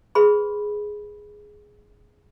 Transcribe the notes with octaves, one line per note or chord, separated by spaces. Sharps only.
G#4 B4 B5 C6